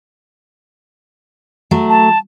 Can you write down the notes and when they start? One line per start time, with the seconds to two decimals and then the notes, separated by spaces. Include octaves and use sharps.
1.71 F#3 A3
1.89 A5